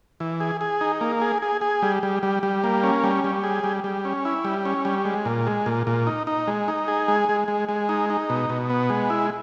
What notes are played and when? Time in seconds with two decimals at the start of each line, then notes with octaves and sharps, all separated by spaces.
0.20 E3
0.40 G#4
0.61 G#4
0.81 D#4
1.01 A#3
1.22 G#4
1.42 G#4
1.61 G#4
1.82 G3
2.03 G3
2.23 G3
2.43 G3
2.64 A#3
2.83 C#4
3.04 G3
3.24 G3
3.44 G#4
3.64 G3
3.84 G3
4.05 C#4
4.25 E4
4.45 G3
4.65 C#4
4.85 G3
5.05 G#3
5.25 A#2
5.47 G#3
5.66 A#2
5.87 A#2
6.07 D#4
6.27 D#4
6.48 G#3
6.68 D#4
6.88 G#4
7.08 G#3
7.29 G#3
7.48 G#3
7.69 G#3
7.89 D#4
8.10 D#4
8.30 B2
8.50 B2
8.70 B3
8.90 G#3
9.10 E4